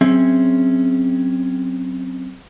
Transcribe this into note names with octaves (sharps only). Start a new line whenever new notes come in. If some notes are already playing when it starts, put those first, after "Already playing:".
F#3 C4 C#4 G#4 E5